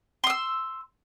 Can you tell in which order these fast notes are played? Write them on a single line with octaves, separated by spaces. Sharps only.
C6 D#6 E6